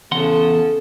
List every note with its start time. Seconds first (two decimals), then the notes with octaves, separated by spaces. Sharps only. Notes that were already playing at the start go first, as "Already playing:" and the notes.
0.12 E2 C#3 A4 F#5 C6